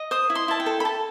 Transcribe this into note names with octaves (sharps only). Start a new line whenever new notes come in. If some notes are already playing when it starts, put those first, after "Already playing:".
Already playing: D#5
C5 D#6
E4
C6
E4 A5
G5
A4
B5
A4 A5